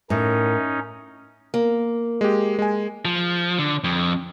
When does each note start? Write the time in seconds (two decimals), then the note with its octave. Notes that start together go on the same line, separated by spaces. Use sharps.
0.10 A2 C#4 D#4 A#4
1.54 A#3
2.21 G#3 G4
2.59 G#3 G#5
3.05 F3
3.59 D3
3.84 F2